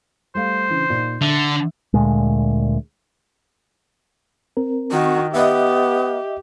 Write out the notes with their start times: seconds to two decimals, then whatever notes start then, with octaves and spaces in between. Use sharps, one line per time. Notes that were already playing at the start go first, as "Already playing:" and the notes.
0.35 G3 A3 C5 F5
0.69 C#3 E3 D4
0.90 A#2 D#4
1.21 D3 E5
1.94 D2 A#2 G#3
4.57 C4 A#4
4.92 D#3 F#4
5.34 B3 G4 D#5 E5